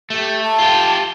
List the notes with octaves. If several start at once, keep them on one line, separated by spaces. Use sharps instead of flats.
A3 G4
A5
F4 G4